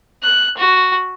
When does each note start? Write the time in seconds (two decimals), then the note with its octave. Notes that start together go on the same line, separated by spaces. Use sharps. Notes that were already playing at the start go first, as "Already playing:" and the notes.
0.23 F#6
0.57 F#4